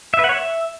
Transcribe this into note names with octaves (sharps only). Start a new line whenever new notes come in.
E5
B4
F#5
C#5
E5